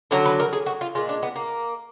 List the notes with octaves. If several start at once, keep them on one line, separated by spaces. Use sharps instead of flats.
D3 F#3 A#4
B4
A#4
G#4
F#4
F4
A#2 G#3 F4
D4
B3
A#3